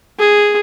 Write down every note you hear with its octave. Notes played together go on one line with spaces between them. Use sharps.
G#4